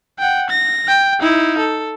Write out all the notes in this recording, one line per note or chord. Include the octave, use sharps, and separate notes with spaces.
F#5 G5
A#6
G5
D#4 E4
A4